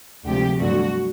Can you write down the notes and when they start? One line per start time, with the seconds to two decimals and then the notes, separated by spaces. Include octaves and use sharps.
0.25 D2 C3 F3 G#3 G4
0.59 G2 D3 F#3 A3 F#4